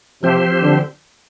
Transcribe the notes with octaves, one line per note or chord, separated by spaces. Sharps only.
C3 F3 C4 G4 C5
D3